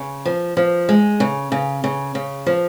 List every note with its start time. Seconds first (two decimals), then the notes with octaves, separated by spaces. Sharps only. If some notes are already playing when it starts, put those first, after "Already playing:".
Already playing: C#3
0.25 F3
0.57 F3
0.89 G#3
1.20 C#3
1.52 C#3
1.84 C#3
2.15 C#3
2.46 F3